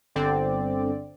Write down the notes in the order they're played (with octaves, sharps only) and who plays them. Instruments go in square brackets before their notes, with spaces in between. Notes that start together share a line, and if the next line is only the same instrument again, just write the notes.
[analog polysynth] G1 D3 C4 D5